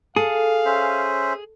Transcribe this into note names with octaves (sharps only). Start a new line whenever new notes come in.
G#4 A4 F5
C#4 C5 E5